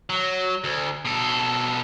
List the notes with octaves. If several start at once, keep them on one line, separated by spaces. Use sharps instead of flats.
F#3
D2
B2 A4